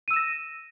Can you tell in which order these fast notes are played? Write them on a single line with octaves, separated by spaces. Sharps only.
D#7 E6 E7 A#6